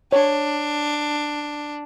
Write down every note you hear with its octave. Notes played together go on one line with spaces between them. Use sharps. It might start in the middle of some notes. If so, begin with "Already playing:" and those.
D4 C#5